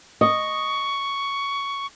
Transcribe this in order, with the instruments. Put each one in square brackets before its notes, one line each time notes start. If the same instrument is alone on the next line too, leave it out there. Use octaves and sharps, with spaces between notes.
[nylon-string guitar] D#5 [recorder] C#6